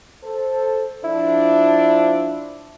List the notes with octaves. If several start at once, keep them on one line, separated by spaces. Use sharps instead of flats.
A4 C5
F3 D4 E4